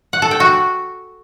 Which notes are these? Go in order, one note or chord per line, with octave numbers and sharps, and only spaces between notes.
F#5
A4
G5
F#4